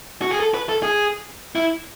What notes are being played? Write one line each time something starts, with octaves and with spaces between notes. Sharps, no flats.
F#4
G#4
A4
B4
A4
G#4
E4